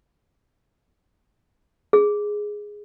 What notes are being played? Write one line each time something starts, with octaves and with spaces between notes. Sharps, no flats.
G#4